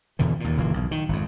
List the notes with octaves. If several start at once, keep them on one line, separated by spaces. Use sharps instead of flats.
E2 B2 D3 E3
D#2 A#2
F#1 A#2 E3 A#3
B1
D#3
G#1 F2